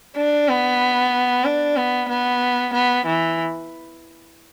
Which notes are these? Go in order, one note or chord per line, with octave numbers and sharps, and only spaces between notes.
D4
B3
D4
B3
B3
B3
E3